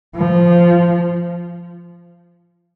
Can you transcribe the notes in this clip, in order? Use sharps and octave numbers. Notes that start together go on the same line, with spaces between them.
F3